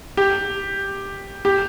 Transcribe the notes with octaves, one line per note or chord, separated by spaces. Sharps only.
G4
G4